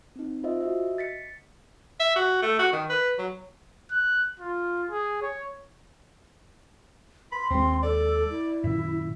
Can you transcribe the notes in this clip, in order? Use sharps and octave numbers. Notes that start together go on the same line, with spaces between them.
C4 D#4
F4 C5 D#5 E5
F#4 D#5 E5
A6 B6 C#7
E5
F#4
A3
F#4
D#3
B4
F#3
F#6
F4
G#4
C#5
B5 C6
D#2 G#3 C4
A4 D5
E4
F#2 A#2 D#3 E5